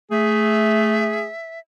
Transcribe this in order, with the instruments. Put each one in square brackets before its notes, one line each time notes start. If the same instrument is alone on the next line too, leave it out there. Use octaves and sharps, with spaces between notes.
[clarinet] A3 [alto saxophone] G#4 [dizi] E5